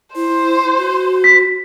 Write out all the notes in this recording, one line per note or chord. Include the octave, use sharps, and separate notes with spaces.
E4 C5
F#4
B6